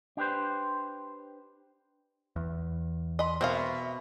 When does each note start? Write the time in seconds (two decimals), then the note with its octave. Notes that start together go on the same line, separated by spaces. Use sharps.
0.17 D4 G4 B4 C5
2.36 E2
3.19 D#5 B5 C6
3.41 B2 C4 A#4 E5 F5